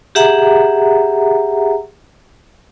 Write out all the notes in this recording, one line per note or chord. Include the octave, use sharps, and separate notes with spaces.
G4 G#4 E5 F#5 A#5